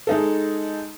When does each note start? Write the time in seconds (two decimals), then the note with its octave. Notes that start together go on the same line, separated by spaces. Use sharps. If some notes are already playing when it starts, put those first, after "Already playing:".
0.07 G#3 D#4 A4